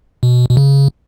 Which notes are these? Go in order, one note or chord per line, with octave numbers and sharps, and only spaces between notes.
B2
B2
C#3